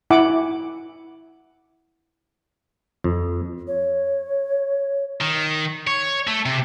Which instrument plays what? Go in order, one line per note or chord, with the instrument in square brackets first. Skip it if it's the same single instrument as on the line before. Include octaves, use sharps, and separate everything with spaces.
[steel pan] E4 F#5 D6
[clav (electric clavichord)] F2
[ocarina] C#5
[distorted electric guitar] D#3
C#5
A3
C3